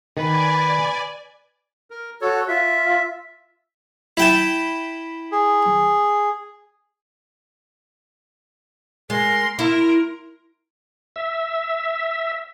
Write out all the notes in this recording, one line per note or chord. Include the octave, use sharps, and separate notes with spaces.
D#3 B4 D5 G#5
A#4
F#4 A4 C#5
F4 E5
E4 G5 A5
G#4
G#3 A#4 C6
E4 A#4 C6
E5